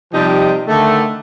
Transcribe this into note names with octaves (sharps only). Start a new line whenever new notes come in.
C3 F3 G3 D#4 G4
D3 D#3 A3